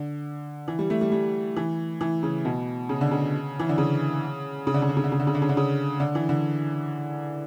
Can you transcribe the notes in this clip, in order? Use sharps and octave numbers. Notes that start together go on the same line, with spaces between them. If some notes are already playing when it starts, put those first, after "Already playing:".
Already playing: D3
E3
G3
A3
G3
G3
E3
E3
C#3
B2
C#3
D3
C#3
E3
D3
C#3
C#3
D3
C#3
D3
C#3
D3
C#3
D3
C#3
D3
C#3
D3
C#3
D3
E3
D3